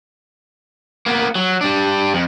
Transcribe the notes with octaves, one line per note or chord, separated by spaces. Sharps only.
A#3 B3
F#3
G3 D4
F2